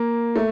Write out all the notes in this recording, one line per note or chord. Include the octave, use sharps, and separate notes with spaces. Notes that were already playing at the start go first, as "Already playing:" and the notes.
Already playing: A#3
A3